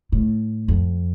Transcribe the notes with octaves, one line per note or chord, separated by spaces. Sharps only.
A2
F2